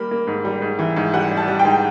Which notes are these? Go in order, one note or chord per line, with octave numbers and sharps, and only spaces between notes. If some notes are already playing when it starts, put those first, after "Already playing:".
Already playing: G3 A#3 B5
A#3
G#2
G3
G#2
E3
G#2
G3 F#5
G3
A5
G3
G5
G#2